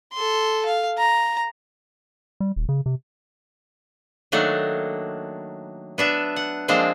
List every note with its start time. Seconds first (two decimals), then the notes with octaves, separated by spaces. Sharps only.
0.13 A4 C6
0.66 F5
0.98 A#5
2.40 G3
2.56 D#1
2.69 C#3
2.86 C3
4.32 D#3 F#3 A3 A#3 D4
5.98 B3 D4 E5
6.36 F#5
6.68 F3 G#3 A#3 C4 D4